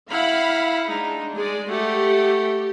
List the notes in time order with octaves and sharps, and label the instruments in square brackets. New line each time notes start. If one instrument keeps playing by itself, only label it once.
[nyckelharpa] E4 F#5 [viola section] F5 B5
[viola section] G#3 D4 [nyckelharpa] D#4
[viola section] G#3 [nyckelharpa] G#4 D5
[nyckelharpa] A3 F#5 [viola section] G4